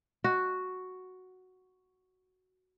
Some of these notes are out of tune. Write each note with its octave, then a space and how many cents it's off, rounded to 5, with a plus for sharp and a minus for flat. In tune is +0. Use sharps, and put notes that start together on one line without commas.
F#4 +0